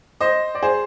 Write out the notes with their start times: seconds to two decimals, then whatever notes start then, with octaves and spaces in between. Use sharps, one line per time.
0.20 C5 D#5
0.55 D5
0.63 G#4 C5